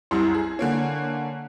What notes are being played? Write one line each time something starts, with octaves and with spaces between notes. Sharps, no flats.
C2 F#2 E4 G4
G#4
D3 A#3 C#4